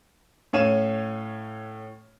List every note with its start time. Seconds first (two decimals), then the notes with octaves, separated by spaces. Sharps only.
0.53 A2 C#4 C#5 F5 D#7 E7